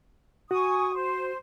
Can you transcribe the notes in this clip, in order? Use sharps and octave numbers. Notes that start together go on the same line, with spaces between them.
F#4 G#5 C#6 D#6
C5